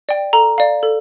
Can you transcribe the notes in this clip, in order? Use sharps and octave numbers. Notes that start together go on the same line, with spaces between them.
D5 G5
A4 A#5
D5 F5
A4